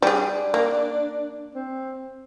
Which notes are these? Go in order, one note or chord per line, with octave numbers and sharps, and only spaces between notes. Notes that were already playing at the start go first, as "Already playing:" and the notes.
G3 D4 G#4
A#3
C4